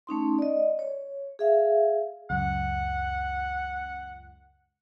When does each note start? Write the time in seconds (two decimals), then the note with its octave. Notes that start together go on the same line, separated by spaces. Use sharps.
0.07 A3 C#4 D#4 C6
0.39 D5 D#5
0.79 C#5
1.39 G#4 E5 F5
2.30 C#2 F#2 F#5